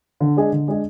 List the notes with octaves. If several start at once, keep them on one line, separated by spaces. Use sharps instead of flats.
D3
G#3 D4 G#4 D#5
D3
G#3 D4 G#4 D#5